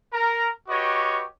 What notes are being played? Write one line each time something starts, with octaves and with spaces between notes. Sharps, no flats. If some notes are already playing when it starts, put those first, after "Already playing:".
A#4 A#5
F#4 G4 B4 C#5 D#5 D6